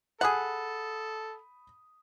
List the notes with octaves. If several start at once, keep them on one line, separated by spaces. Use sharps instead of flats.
G#4 A4 F#5 B5 D#6